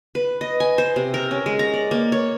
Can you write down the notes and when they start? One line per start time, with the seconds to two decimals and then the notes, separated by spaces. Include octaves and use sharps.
0.15 B4
0.41 D#5
0.60 G#5
0.78 C5
0.96 C3
1.14 A#4
1.31 C#4
1.46 G#3
1.59 A#5
1.73 D5
1.91 A#3
2.12 C#5